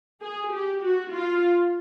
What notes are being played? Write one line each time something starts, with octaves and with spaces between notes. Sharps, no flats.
G#4
G4
F#4
F4